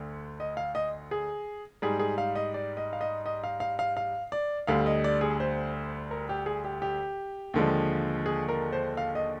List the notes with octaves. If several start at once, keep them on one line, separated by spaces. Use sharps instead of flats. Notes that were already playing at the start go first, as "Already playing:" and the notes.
Already playing: D2 D3
D#5
F5
D#5
G#4
G#2 G3 G#4
G#4
F5
D#5
D5
D#5
F5
D#5
D#5
F5
F5
F5
F5
D5
D2 D3 G3 F5
D#5
D5
G#4
C5
A#4
G4
G#4
G4
G4
D#2 D3 F3 G#3
G#4
A#4
C5
F5
D#5